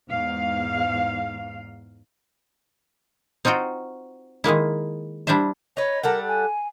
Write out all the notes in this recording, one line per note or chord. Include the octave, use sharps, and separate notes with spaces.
E2 G#2 F5
C4 D#4 F4 F#4 G5
D#3 G#3 A#3 E4
G3 D4 E4 C5 E5
D#4 B4 C#5
G3 A4 A#4 F#5
G#5